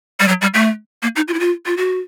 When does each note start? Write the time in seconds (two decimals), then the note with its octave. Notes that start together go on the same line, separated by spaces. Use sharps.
0.20 G3
0.28 F#3
0.42 G3
0.54 A3
1.03 A#3
1.16 D#4
1.28 F4
1.34 E4
1.40 F4
1.66 F4
1.77 F#4